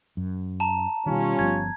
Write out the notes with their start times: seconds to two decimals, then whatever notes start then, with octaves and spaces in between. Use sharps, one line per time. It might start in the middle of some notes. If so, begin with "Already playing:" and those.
0.17 F#2
0.60 A5 A#5
1.06 B2 D#3 G3 C#4 F4
1.39 G1 F3 B3 G#6